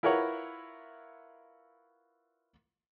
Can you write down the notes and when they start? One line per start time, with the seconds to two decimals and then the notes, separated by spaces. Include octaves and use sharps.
0.03 E4 F4 A#4 B4 C#5 F#5